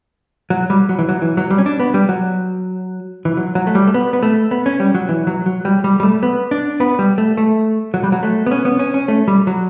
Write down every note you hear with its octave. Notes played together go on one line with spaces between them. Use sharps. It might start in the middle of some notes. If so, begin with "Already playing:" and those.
F#3
G3
F#3
E3
F#3
E3
F#3
G3
C#4
D4
B3
G3
F#3
E3
F#3
F#3
A3
G3
A3
B3
B3
A3
B3
C#4
G3
F#3
E3
F#3
F#3
G3
G3
G3
A3
B3
D4
B3
G3
A3
A3
F#3
G3
F#3
A3
B3
C#4
B3
C#4
C#4
A3
G3
F#3